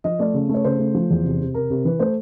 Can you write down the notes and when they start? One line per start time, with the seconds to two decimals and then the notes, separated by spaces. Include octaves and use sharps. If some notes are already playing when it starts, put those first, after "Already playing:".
0.04 F3 D#5
0.19 A3 D5
0.34 C#3
0.49 A3 C#5
0.64 C#3 C5
0.79 A3
0.95 F3
1.10 E2
1.24 C3
1.40 C3
1.54 C3 A#4
1.70 C3
1.85 E3 B4
2.00 A3 C5